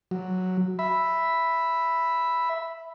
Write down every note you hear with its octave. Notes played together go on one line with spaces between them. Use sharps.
F#3
E5 B5